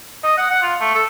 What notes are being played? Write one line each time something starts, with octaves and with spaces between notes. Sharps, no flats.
D#5
F#5
F#5
F4
A3
A4